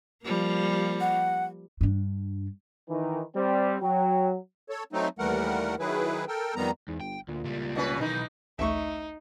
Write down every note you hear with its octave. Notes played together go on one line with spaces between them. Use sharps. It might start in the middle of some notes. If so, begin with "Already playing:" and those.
F3 G3 A#3
F#5
G2 D4
D#3 E3
G3 C4
F#3 G5
A4 C#5
F#3 A3 C4 D#4
D#2 E3 G3 A3 A#4 F#5
D#3 F#3 E4 G#4 B4
A4 A#4 G5
F2 D#3 G3 B3 A#5
E2 G#2
G1 G5
D2 A#2
C#2 G3
B2 C#4 B4
B1 D#3 E3 D#4 B4
A1 D2 A3 D#4 E5 C#6